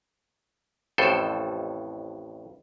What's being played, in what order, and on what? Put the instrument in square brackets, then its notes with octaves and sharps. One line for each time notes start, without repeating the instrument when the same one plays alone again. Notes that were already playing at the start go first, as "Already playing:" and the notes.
[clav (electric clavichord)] A1 F2 A2 A4 C5